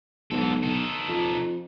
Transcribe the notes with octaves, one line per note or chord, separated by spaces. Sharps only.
B1 G#2 A4
D#4 A4
F2